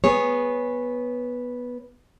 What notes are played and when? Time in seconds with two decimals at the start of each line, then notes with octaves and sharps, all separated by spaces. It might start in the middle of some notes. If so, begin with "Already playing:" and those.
0.04 B3 G#4 C#5